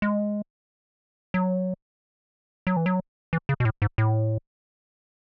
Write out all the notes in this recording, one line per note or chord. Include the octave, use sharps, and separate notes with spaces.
G#3
F#3
F#3
E3
F#3
E3
C#3
B2
A2
G#2
A2